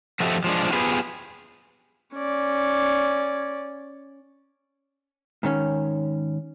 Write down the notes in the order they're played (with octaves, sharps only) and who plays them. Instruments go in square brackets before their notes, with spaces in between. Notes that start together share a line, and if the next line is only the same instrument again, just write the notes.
[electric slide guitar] F3 F#4 G4 A4 D#5 E5
F3 G#3 D4
B3 F4 G4 G#4 B4
[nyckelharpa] C#4 D5
[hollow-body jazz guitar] G#2 D#3 C#4